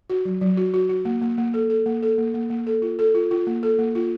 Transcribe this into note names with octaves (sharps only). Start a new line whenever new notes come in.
F#4
F#3
F#3
F#4
F#4
F#4
A#3
A#3
A#3
A4
A4
A#3
A4
A#3
A#3
A#3
A4
F4
A4
F4
F4
A#3
A4
A#3
F4